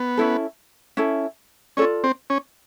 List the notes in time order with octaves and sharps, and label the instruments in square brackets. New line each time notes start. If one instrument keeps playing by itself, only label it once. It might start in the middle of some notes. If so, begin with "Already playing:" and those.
Already playing: [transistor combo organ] B3
[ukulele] C#4 E4 A4
C#4 E4 A4
[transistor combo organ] C#4 [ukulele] F4 A4 D5
[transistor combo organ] C4
C#4